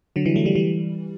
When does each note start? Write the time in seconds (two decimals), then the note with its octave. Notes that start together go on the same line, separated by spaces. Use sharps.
0.16 D3 F#3
0.25 E3 G3
0.36 F#3 A3
0.45 E3 G3
0.55 E3 G3